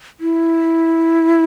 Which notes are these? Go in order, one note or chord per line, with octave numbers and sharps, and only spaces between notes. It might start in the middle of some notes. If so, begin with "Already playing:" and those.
E4